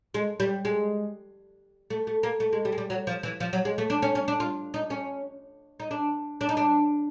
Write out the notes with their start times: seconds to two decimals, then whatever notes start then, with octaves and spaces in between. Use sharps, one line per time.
0.14 G#3
0.40 G3
0.65 G#3
1.90 A3
2.07 A3
2.23 A#3
2.40 A3
2.53 G#3
2.65 G3
2.72 G#3
2.78 G3
2.90 F#3
3.07 F3
3.23 E3
3.40 F3
3.53 F#3
3.65 G#3
3.78 A3
3.90 D4
4.02 C#4
4.15 C#4
4.28 D4
4.40 F4
4.74 D#4
4.90 C#4
5.80 D#4
5.91 D4
6.41 D4
6.49 D#4
6.57 D4